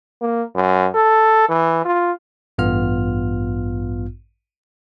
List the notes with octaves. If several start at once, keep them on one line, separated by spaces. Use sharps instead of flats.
A#3
F#2
A4
E3
F4
A1 G2 B3 F4 F6